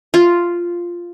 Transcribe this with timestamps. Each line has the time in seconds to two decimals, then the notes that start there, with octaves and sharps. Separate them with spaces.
0.14 F4